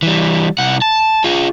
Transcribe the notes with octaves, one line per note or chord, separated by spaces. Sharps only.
E3 G3
C2 F#5
A5
F4 G#4